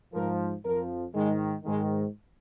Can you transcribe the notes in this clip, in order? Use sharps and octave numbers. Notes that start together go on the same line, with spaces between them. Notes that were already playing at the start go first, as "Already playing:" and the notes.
G#2 F3 A#4
F2 F3 A#4
G#2 D#3 G#3
G#2 D#3 G#3